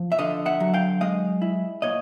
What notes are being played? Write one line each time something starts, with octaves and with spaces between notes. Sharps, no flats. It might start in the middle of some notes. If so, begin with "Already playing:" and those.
Already playing: F3
E5
D3 D#5 F5
E5 F#5
F#3
F5 G5
G#3 D#5 F5
E4
A#2 C#5 D#5